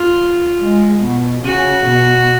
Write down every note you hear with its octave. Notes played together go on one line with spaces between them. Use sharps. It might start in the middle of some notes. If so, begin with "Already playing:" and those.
Already playing: F4
G#3
B2
C#3 F#4
B2